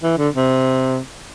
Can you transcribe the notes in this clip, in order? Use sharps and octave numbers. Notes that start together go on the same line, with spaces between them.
E3
D3
C3